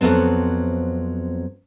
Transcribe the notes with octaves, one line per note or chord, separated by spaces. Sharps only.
F2 F#3 B3 C4